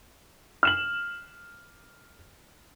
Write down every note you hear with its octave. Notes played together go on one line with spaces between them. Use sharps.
F6 E7 F#7